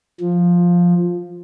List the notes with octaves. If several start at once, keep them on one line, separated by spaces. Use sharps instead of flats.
F3